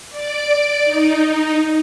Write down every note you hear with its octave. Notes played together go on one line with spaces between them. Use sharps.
D5 D6
D#4